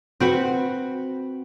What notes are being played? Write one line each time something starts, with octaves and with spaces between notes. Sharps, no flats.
C4 F#4 B4